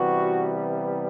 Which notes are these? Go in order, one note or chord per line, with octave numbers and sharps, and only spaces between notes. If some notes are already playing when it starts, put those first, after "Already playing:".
Already playing: C3 E3 G3 B3 F#4